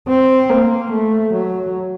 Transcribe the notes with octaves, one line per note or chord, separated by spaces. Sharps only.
C4
A#3
A3
F#3